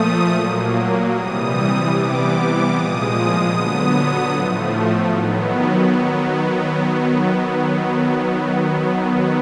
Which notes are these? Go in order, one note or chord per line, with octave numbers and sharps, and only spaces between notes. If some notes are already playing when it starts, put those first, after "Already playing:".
Already playing: A#2 F3 A3 D#6
A#2 F#3 A#3
C3 E3 G3 D#6
C3 E3 G3 B3 D6
D6
A#2 F3 G#3 D#6
D3 F#3 B3
A2 F3 A3
D#3 F#3 B3